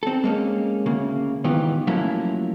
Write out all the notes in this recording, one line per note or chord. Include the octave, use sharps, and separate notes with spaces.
C4 A4
G#3 A#3 C#4
D2 C#3 A#3
G#2 D#3 E3 B3 F4 G4
F3 F#3 A3 A#3 C#4 E4